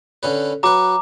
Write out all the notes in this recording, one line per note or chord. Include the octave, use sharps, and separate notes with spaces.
D3 C#4 B4
F#3 B4 A#5 D6